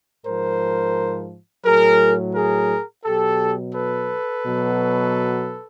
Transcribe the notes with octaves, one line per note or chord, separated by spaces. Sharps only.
G#2 F3 A#4 C5
A2 F#3 G#4 A#4
G#4 A#4
B2 F#3 G4 A4
A4 B4
B2 F#3